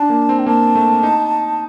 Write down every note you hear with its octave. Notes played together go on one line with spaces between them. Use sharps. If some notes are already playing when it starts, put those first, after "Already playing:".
Already playing: D4 A5
A#3
C4
G5
A#3 A5
A3
D#4